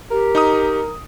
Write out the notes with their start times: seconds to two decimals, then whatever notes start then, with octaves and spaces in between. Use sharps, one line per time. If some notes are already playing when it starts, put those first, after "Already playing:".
0.11 G4 A#4
0.35 D#4 A#5 D#6